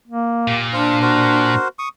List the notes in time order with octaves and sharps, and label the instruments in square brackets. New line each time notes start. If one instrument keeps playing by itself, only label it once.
[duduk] A#3
[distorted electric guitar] A#2 [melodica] G4
[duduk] D4 [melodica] C5 F5
[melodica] F#4 A#4 C5
C#6 D#6